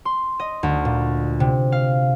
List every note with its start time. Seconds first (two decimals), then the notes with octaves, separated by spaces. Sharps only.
0.05 C6
0.40 D#5
0.63 D2
0.85 A#2
1.40 C3
1.72 F5